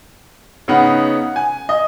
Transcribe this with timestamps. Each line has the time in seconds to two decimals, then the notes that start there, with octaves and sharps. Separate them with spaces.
0.68 C#3 B3 D#4 F#5
1.36 G#5
1.69 D#5